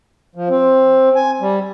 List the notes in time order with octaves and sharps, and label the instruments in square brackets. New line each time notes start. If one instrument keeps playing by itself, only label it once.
[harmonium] F3
C4
G#5
G3